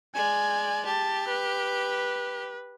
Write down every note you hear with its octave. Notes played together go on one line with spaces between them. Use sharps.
G#3 D5 G#5
G4 A5
B4